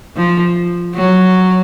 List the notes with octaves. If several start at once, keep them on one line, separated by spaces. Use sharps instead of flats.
F3
F#3